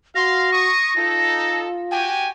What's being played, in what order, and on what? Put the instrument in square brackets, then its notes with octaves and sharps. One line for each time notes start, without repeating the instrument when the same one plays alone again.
[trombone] F#4 [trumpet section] F5 C6 [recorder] A#6
[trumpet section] C#6 D#6
[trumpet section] D#4 A4 [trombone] F4
[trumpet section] F#4 G4 G#5 [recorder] G5